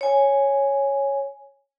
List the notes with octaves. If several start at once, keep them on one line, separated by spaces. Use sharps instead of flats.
C#5 G#5